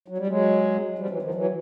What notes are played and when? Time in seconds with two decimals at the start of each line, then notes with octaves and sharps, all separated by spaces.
0.08 F#3
0.18 G3
0.27 F#3 G#3
0.98 F3 G3
1.10 E3 F#3
1.22 D#3 F3
1.34 E3 F#3